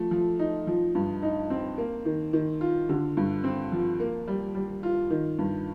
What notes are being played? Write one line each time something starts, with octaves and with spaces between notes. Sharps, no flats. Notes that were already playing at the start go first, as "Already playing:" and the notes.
Already playing: F3 A3
F3
D#4
F3
G2
D#4
C4
A#3
D#3
D#3
F4
D3
G2
C4
F3
A#3
G3
G3
F4
D#3
G2